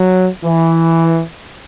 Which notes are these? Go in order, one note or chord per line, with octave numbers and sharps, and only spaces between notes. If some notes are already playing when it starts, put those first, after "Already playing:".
Already playing: F#3
E3